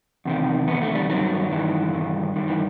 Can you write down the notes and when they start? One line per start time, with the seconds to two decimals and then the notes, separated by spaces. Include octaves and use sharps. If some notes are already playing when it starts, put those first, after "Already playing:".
0.25 E2 C3 D#3
0.68 E2 C3 D#3 B3
0.82 A3
0.95 G3
1.09 G2 D#3 F#3
1.51 G2 D#3 E3
1.93 G2 D#3
2.36 G2 D#3
2.48 E3